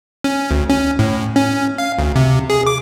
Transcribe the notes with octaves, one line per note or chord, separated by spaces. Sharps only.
C#4
D2
C#4
A2
C#4
F5
D2
C3
G#4
D6